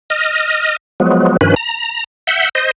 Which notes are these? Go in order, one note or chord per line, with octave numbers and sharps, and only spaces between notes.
D#5 F6
F3 F#3 G#3 B3
G2 D#3 F3 C#4 B4
A#5
E5 F#5 G6
C5 D#5